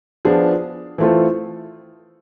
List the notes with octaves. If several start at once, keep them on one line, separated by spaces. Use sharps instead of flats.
F3 B3 D4 F4 G#4
E3 A3 C4 F4 A4